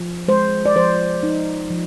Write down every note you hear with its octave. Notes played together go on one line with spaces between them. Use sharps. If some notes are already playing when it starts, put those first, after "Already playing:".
Already playing: F3
G#3 C5
D5
F3 C5
D#4
F3